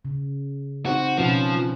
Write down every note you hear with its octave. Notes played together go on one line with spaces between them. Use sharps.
C#3
C4 D#4 F#4 C5
B2 F3 C#4 B4